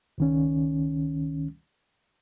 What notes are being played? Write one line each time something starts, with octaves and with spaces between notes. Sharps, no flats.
C#2 D#3 C#4